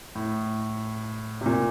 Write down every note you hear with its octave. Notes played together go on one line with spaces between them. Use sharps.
A2
C3
A#2